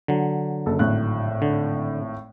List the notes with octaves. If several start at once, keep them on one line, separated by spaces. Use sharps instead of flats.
D3 F#3
F#1 A4
G#1 A2 F#6
D3